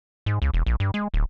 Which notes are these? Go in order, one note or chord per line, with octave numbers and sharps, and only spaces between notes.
G#2
C#2
E1
A#1
G2
G#3
D1